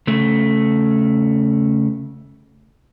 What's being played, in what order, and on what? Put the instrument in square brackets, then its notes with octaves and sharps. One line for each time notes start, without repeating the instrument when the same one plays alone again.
[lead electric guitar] C#3 A3